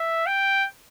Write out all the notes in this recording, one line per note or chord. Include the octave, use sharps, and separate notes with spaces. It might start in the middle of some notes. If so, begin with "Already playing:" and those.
Already playing: E5
G5